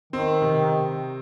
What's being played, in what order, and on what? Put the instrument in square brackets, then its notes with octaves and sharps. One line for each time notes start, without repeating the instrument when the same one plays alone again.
[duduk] D#3 [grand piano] C4
[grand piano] C3